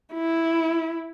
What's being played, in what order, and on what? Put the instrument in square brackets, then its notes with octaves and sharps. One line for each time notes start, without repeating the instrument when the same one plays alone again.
[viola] E4